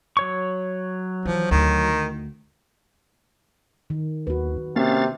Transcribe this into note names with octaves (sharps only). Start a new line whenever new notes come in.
F#3 C#5 C#6
E3 F3
D2 D#3
D#3
D#2 F#4 B4
C3 A#3 C#4 F5 A6